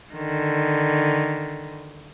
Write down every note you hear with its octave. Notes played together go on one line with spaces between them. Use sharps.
D3 D#3